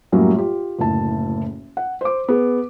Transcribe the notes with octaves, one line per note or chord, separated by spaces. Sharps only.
F#2 A2 F#3 G3 A#3
F4 G4
F#1 D2 A2 A5
F#5
C5 D6
B3 G#4